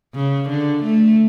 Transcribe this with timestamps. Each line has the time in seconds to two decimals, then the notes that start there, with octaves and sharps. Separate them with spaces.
0.15 C#3
0.50 D3
0.84 A3